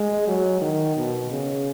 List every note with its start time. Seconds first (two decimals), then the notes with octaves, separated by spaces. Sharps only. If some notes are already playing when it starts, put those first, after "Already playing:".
Already playing: G#3
0.27 F#3
0.61 D#3
0.97 B2
1.31 C#3